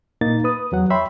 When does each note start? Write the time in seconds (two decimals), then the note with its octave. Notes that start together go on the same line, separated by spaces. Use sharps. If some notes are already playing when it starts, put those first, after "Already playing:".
0.21 A#2 A#3 D#4 A6
0.44 B4 D#6
0.72 E2 F#3 F#5
0.90 C#5 E5 G5 B5 C6